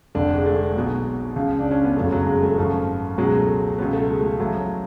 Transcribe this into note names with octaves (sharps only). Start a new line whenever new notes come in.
F1 F2 D3 D4
G#3
A3
G#3
B1 B2 F#3
C#2 C#3 F3
D4
C#4
B3
F#1 F2 C#3 F#3 A3
F#3
G#3
A3
G#1 F#2 F3 A3
C#2 B2 F#3 G#3
A3
C#2 B2 F#3 B3
A3
G#3
A3
A1 A2 F3 F#3